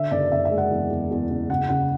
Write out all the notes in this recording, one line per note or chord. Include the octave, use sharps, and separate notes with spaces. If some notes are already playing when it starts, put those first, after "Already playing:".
Already playing: D3 E5
F#1 D5
F#1 E5
E5
G#3
F#5
E2
E2
E2
F#1
C#3 F#5
C#3 F#5